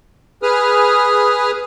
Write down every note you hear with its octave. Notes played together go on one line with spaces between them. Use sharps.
G#4 B4 D#6 F6